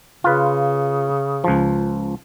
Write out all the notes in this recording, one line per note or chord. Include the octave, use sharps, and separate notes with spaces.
C#3 F4 B4
C#2 F3